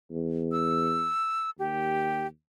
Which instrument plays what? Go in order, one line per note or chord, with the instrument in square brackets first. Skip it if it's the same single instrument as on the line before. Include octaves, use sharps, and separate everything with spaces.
[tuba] E2
[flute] E6
[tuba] D#2 [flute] G4